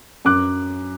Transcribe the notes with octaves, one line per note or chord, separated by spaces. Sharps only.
F#2 D6 F#6